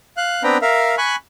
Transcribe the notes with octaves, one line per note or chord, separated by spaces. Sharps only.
F5 F#6
B3 C4 D4 B4 G5 A#5
A#4 E5 F5
G#5 B5 C#6 F#6